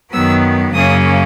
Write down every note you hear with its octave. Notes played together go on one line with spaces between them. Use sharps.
F#2 D#3 F#3 B3 E6
F#2 C#3 F#3 A#3 C#4 D#6